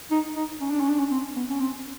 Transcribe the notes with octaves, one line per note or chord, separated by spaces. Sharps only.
D#4
D#4
C#4
D4
C#4
D4
C#4
C4
B3
C#4
C4